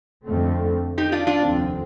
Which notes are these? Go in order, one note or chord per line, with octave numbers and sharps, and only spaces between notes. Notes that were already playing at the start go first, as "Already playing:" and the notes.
F2 D3 A3 C4
D#4 G4
D4 F4
D4 F4
F1 D#2 D3 F3 C4